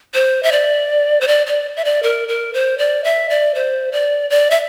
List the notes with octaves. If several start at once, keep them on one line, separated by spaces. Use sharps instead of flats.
C5
E5
D5
C5
D5
D5
E5
D5
A#4
A#4
C5
D5
E5
D5
C5
D5
D5
E5